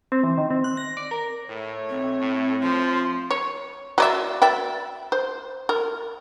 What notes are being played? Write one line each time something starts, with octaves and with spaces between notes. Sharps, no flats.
C4
E3
D#3
C4
F#6
A#6
D5
A#4
A2 A3 C#5
B1 C4
A2
F3 C6
C#5
F#3 D5 E5
D5 E5 G5
C5
A#4